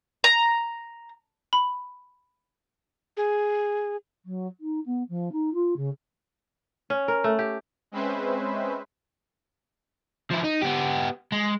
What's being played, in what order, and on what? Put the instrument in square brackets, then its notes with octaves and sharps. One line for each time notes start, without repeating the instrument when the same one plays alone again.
[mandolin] A#5
[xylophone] B5
[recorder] G#4
[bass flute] F#3
D#4
B3
F3
D#4
F4
C#3
[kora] C#4
A#4
A3
G4
[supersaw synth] G#3 C4 C#4 B4 C5 E5
[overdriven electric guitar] F3 E4
D#4
B3 G4
G#3